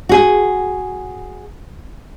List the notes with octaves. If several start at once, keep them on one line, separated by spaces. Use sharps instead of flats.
F#4 G#4